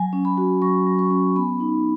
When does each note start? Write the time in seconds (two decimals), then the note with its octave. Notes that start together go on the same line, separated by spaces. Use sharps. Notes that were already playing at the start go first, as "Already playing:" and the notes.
Already playing: F#3 G#5
0.13 C#4
0.25 B5
0.38 F#4
0.62 F#3 C#6
0.86 F#3
0.99 C#6
1.11 C#4
1.36 B3 B5
1.60 D#4